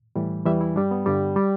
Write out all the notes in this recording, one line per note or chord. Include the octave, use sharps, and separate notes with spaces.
A2 E3 G3
E2 E3 G3 E5
E4
G2 G3 D4
B3
G2 D3 G3
G3